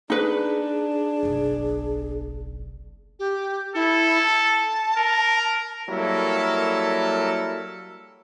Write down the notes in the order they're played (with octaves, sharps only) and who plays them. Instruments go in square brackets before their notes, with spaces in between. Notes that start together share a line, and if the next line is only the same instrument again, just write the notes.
[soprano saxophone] D4 [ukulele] D#4 B4 [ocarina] G#4
[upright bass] F#1 B1
[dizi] G4
[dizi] E4 [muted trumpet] A4
[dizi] A5
[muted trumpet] A#4
[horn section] F#3 G3 A#3 E4 A4 A#4